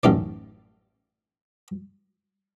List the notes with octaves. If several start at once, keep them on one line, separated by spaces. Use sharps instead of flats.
A1 F#2 D#4 D5